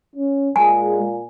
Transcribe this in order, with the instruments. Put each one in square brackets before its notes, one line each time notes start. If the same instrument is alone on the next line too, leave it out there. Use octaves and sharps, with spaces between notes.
[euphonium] C#4
[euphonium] A#2 [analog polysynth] G#3 [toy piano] G#5